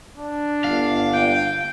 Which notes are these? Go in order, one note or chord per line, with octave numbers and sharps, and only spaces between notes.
D4
G1 F5
G5